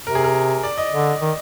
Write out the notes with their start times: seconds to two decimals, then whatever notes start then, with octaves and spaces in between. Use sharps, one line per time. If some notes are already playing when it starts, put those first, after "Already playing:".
0.06 C3 A#4
0.15 G#4
0.24 A#4
0.64 D5
0.78 D#5
0.93 D3
1.22 D#3